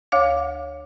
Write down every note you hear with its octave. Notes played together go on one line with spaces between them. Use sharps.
D2 C#5 F5 D6